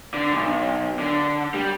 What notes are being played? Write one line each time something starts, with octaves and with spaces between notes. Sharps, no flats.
D3
B1
D3
G3